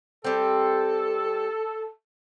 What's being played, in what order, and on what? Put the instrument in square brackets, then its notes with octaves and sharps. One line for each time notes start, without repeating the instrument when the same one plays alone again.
[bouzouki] G3 C4 [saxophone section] A4